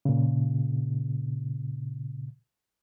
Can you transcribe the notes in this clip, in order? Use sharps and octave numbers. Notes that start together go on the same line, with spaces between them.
A#2 C#3